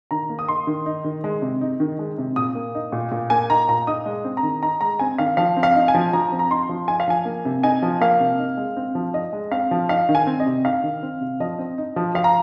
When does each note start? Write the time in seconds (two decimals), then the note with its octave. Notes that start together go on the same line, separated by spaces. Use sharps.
0.11 D#3 A#5
0.30 A#3
0.39 D#6
0.48 D#4 C6
0.67 D#3
0.86 D#4
1.04 D#3
1.24 G#3
1.42 C3
1.61 D#4
1.80 D#3
1.99 G#3
2.18 C3
2.36 A#2 D#6
2.55 A#3
2.75 D#4
2.92 A#2
3.12 A#2
3.30 A#3 G#5
3.50 D#4 A#5
3.68 A#2 A#5
3.87 D#4 D#6
4.06 G#3
4.25 C4
4.37 A#5
4.43 D#3
4.62 D#4 A#5
4.81 G#3 A#5
4.99 C4 G#5
5.18 D#3 F5
5.37 F3 F5
5.57 C4
5.63 F5
5.76 D#4
5.88 G#5
5.94 F3
6.13 F3 A#5
6.32 C4
6.39 A#5
6.51 D#4 C6
6.69 F3
6.88 D#4 G#5
7.00 F5
7.08 F3 G#5
7.25 A#3
7.45 C3
7.63 D#4 G#5
7.82 F3
8.01 A#3 F5
8.20 C3
8.39 D#4
8.57 G#3
8.76 C4
8.95 F3
9.14 D#4 D#5
9.33 G#3
9.51 C4 F5
9.71 F3
9.89 D#4 F5
10.09 D#3
10.15 G#5
10.27 C4
10.40 D#5
10.46 C3
10.65 D#4 F5
10.84 D#3
11.03 C4
11.21 C3
11.40 F3 D#5
11.59 C4
11.78 D#4
11.96 F3
12.15 F3 F5
12.24 A#5